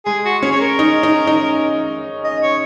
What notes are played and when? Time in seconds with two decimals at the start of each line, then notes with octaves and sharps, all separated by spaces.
0.06 G#3 G#4
0.25 F#4
0.43 C#4 G#4
0.52 C#5
0.61 A#4
0.79 D#4
1.03 D#4
1.27 D#4
2.24 D#5
2.43 C#5